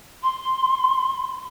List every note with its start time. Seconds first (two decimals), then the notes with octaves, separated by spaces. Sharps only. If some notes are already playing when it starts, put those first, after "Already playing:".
0.23 C6